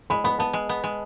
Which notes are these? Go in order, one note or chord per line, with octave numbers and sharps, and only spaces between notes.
G#3 B5
B3 B5
B3 A5
G#3
B3
G#3